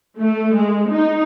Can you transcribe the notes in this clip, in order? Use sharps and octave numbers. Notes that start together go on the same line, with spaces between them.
A3
G#3
D#4